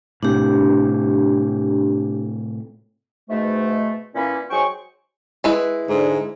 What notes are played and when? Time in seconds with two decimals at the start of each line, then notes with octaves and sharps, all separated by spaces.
0.23 A2 C3 D4 G4
3.30 G#2 B2 A3
4.15 A#2 E3 C#4 B5
4.50 G#2 F#3 G#4 C5 G5 C#6
5.44 G#3 E4 B4
5.88 G#2 D3